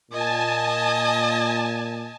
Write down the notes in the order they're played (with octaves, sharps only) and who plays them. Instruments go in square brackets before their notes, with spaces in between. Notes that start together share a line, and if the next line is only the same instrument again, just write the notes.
[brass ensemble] A#2 [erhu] D#5 [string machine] G#5 A5